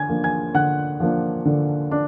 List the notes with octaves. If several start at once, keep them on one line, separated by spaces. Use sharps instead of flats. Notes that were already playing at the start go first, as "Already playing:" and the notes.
Already playing: D3 G#5 G#6
F3 A#3 D4
G#5 G#6
D3 F#5 F#6
F3 A#3 D4
D3
D4